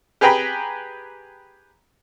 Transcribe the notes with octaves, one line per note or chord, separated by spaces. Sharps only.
G4 G#4 B4 G5 A#5 B5